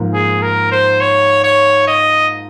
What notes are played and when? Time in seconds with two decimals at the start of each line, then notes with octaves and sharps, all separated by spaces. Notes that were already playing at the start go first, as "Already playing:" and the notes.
Already playing: G#2 F3 A#3
0.14 G#4
0.42 A#4
0.71 C5
1.00 C#5
1.44 C#5
1.88 D#5